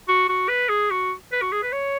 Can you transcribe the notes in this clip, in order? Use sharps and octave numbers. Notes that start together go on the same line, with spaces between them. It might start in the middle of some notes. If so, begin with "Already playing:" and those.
F#4
F#4
B4
G#4
F#4
B4
F#4
G#4
B4
C#5